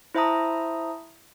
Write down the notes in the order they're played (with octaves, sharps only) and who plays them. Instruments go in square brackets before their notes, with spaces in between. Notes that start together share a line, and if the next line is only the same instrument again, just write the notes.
[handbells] E4 C5 E5 A5 A#5 D#6